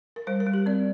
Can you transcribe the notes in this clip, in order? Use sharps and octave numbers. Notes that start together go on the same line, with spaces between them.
A#4
G3 C5
A#4
G3
G4
C4 D5